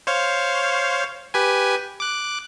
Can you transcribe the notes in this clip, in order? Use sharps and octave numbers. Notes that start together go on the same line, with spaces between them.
C5 C#5 F5
G4 B4 G#5
D6 F#6